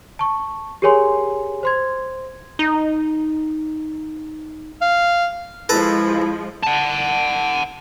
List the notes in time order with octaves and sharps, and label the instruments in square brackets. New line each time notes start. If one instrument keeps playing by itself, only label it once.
[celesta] A5 C#6
G4 G#4 A#4 C#5 G#5 C6
C5 C6 G#6
[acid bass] D#4
[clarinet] F5
[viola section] F3 G#3 [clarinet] E4 [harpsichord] A4 B4 A#5
[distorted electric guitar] F#5 A5